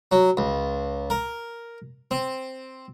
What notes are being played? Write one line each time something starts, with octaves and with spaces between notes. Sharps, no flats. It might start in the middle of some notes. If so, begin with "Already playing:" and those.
F#3
C#2
A#4
C4